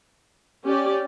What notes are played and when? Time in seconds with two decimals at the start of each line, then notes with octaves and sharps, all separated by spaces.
0.65 C#4 G4 D5